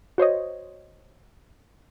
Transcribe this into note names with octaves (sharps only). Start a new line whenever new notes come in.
F#4 C5 C#5 D#5